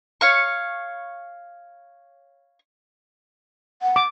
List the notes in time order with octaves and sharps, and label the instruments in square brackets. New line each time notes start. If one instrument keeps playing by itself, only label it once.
[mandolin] C#5 F5 C#6
[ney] F#5
[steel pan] D6